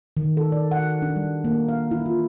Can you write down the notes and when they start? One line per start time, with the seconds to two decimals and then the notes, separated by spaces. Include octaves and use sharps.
0.17 D#3
0.37 A4
0.52 D5
0.71 F#5
1.02 D4
1.16 G3
1.44 A#3
1.69 F5
1.91 E4
2.06 F4